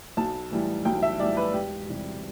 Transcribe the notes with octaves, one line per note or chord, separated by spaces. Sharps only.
B1 A5
A2 E3 G3
B1 G5
E5
A2 E3 G3 D5
B4
E1 G4
E2 C3 G3